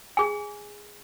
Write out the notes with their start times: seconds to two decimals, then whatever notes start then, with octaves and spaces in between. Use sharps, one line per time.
0.17 G#4 G#5